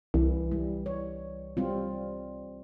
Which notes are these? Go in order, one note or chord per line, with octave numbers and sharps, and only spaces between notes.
C2 E3
G3
C#5
G3 C4 F4